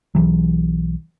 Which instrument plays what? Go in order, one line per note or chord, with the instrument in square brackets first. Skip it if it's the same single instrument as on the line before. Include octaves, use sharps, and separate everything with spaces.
[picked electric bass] B1 E3 F#3